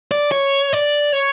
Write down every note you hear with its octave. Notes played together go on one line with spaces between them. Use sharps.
D5
C#5
D5
C#5